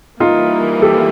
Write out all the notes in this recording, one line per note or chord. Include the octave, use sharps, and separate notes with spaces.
E3 G3 A#3 D#4 F4
G4 A4